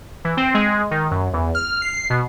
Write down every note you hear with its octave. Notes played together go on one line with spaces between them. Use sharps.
E3
C4
G#3
D#3
F#2
E2
F6
C7
B2